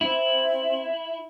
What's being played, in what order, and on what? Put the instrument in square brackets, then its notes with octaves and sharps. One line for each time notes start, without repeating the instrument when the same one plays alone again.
[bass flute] C4 [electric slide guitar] E4